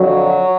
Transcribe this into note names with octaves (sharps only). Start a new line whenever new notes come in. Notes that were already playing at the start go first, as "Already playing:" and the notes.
Already playing: F2 D3 F#3